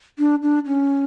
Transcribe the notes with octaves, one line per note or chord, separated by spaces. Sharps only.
D4
D4
C#4